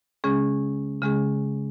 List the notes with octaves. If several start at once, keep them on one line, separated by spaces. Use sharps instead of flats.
C#3 G#3 C#4 G#4
C#3 G#3 C#4 G#4